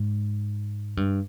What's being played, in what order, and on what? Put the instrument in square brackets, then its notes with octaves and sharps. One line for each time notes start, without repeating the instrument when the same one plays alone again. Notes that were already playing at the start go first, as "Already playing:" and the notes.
Already playing: [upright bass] G#2
G2